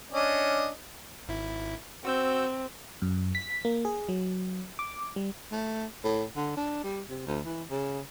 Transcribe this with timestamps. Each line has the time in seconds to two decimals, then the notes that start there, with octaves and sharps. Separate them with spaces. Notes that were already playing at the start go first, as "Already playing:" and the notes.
0.11 C#4 D4 D#5
1.28 G#1 E4
2.05 C4 F#4 E6 G6
3.02 F#2
3.35 B6
3.65 A#3
3.85 G#4
4.09 F#3
4.79 D6
5.16 G3
5.52 A3
6.04 A2
6.36 D3
6.57 D4
6.84 G3
7.08 C3
7.27 D2
7.45 E3
7.70 C#3